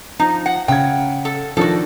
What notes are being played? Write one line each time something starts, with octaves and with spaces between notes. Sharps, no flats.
F3 D#4
F#5
C#3 F#5 G5 G#6
A4
D#3 F3 D4 F#4 A4